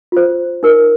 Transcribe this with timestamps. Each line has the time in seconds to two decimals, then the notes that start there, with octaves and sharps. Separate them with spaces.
0.12 F4 C5
0.63 D#4 A#4